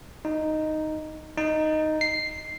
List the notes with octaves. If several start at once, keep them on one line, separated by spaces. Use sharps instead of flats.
D#4
D#4
C7